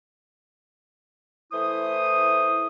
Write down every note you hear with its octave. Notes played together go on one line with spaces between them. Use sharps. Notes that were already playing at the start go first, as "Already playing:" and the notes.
E3 A3 E4 C5 D#6